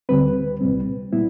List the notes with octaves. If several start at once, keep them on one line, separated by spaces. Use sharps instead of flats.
D2 D3 G3 C4 B4
C2 A#2 G3 C4
A#2 G3 B3 E4